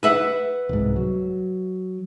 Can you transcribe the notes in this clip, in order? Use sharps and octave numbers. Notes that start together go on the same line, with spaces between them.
B4 E5 F#5
C2 G#2
F#3